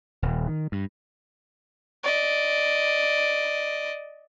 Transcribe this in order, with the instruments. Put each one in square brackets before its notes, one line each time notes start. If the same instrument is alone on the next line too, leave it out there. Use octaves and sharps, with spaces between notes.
[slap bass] D#1
D#3
G2
[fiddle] D5 D#5